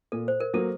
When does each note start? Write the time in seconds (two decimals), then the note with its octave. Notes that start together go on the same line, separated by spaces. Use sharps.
0.12 A#2 A4
0.28 C5
0.40 A#4
0.54 F#3 A#3 A4